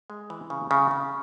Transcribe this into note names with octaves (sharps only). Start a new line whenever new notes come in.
G#3
E3
C#3
C#3
C#3